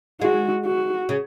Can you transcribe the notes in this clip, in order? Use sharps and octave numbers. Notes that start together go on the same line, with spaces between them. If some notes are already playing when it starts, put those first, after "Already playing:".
G#3 F#4
F#4
C#3